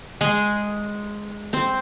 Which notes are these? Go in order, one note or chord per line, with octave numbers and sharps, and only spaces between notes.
G#3 G#4
C4 C5